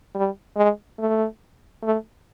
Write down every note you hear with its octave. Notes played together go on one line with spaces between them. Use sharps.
G3
G#3
A3
A3